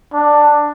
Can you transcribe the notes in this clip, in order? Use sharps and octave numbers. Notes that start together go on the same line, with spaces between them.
D4